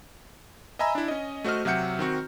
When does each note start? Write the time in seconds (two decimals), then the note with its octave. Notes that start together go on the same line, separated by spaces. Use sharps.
0.79 D#5 E5 G#5 A#5 B5 E6
0.95 D4 E4
1.08 C#4 D#5
1.44 A3 F#4 C5 D#5 F6
1.65 C3 F#3 E5 F#5 G6 C#7
1.99 D#3 C4 F#4